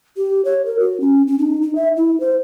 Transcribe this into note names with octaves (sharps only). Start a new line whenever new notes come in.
G4
C#5
A#4
F#4
C#4
C#4
D#4
D#4
E5
E4
C5